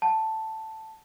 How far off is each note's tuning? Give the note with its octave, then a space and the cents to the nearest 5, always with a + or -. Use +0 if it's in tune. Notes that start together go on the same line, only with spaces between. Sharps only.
F#5 +0 A5 +5